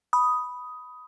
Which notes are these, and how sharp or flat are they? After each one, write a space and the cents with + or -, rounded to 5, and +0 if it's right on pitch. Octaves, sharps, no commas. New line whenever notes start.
B5 +0 D#6 +5